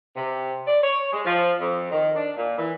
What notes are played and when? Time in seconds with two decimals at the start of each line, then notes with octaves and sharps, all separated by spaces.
0.15 C3
0.66 D5
0.83 C#5
1.12 G#3
1.25 F3
1.60 F2
1.91 D#3
2.16 D4
2.36 A#2
2.58 E3